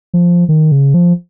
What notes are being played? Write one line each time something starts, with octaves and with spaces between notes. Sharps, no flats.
F3
D#3
C#3
F3